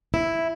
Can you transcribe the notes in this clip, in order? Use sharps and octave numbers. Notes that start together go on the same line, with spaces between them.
E4